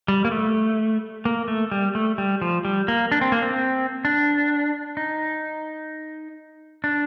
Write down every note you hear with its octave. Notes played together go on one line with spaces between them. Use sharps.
G3
A#3
A3
A#3
A3
G3
A3
G3
F3
G3
A#3
D4
C4
A#3
C4
D4
D#4
D4